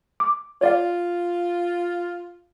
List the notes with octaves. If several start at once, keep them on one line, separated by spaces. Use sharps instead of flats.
D6
F4 C#5 D5 F5